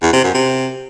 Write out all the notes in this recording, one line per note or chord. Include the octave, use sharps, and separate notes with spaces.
E2
C3
F#2
C3